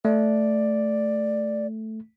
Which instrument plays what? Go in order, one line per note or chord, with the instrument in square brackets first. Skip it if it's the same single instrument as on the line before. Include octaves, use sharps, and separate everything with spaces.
[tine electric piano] A3 [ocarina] D5